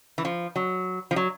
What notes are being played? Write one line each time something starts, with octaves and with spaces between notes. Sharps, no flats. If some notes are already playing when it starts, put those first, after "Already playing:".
E3
F3
F#3
F3
F#3